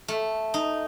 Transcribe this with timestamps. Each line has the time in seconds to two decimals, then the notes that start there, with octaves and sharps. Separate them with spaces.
0.08 A3
0.54 D#4